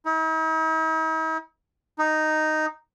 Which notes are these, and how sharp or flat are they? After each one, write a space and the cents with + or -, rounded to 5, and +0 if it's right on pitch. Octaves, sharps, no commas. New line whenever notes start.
D#4 +45
D#4 -5